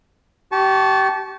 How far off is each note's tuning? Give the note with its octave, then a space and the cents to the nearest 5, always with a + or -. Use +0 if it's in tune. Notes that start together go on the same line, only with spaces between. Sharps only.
G4 -30 A5 -25 C#6 +0